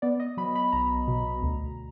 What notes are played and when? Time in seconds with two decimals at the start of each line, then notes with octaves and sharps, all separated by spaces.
0.02 B3 D5
0.20 D#5
0.37 F#3 B5
0.55 B5
0.72 B1 A#5
1.08 B2
1.42 D2